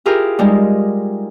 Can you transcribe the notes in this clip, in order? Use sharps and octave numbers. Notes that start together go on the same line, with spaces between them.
E4 F4 G4 G#4 A#4
G3 G#3 D#4